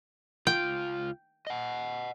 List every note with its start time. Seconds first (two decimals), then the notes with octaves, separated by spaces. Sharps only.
0.47 C#2 F4 G5
1.47 D#5 F#5